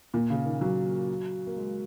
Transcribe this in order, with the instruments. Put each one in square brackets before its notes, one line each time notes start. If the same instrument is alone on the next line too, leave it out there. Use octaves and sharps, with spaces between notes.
[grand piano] A#2
C#3
D#3
F#3
A#3
G#3